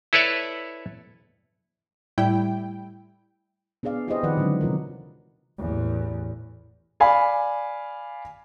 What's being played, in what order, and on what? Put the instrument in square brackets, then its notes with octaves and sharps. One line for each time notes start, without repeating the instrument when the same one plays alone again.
[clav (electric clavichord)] E4 A4 B4 C#5 D5 E5
[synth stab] A2 G3 E4 G5
[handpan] B3 D4 G#4 D5 F5
E4 G4 G#4 B4 C5 D#5
D#3 F3 B4 D5 F#5
D3 F#3 G#3 C#4 D4
C3 E3 F4 A#4
[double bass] A1 E2
[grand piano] D5 F5 G#5 B5